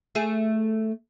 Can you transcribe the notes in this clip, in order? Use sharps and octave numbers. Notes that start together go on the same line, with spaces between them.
A3 G#4